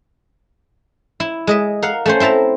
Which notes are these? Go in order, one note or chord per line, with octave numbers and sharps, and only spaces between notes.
E4
G#3 D#5 E5
A#4 F5 F#5
A3 C#4 C5
C4 E4 E5 A5 A#5